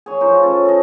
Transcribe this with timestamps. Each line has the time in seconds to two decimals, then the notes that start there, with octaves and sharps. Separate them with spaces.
0.06 G#4 C#5
0.21 F3 D#4 C5
0.43 C#4 A4 B4
0.65 A4 D#5